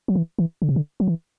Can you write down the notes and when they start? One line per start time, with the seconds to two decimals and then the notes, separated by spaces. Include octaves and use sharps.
0.08 F#3
0.15 E3
0.39 E3
0.62 D3
0.69 C3
0.76 D3
1.00 F#3
1.07 E3